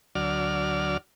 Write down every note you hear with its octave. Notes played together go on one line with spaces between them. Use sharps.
D2 F#3 D5 F6